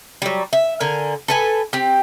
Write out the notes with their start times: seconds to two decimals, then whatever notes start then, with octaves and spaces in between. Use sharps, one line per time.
0.22 F#3 G3
0.53 E5
0.80 D3 A#4 G#5
1.28 A4 B4 G#5
1.73 C4 G4